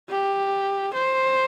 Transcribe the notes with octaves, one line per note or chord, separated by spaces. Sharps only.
G4
C5